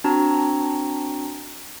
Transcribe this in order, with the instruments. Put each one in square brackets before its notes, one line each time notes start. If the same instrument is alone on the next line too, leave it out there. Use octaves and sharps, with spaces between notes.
[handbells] C4 D4 F#4 A5 A#5